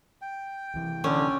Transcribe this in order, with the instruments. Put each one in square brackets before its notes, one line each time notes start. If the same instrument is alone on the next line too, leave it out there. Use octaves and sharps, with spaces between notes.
[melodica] G5
[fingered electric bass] C2 E3
[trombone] D3 [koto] C#4